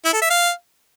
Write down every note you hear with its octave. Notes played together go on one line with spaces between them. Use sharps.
E4
A4
E5
F5